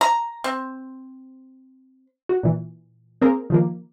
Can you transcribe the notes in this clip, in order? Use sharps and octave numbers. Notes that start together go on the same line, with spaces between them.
A#5
C4
F#4
A#2 E3
A#3 C4 G#4 A#4
D#3 F3 A#3